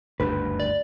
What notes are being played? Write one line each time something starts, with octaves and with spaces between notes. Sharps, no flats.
F#1 D2 G2 B4
D5